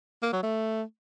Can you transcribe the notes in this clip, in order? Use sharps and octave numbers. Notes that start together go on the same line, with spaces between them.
A#3
F#3
A3